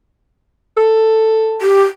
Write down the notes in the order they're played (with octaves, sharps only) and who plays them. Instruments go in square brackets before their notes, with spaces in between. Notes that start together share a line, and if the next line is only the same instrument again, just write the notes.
[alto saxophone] A4
[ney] G4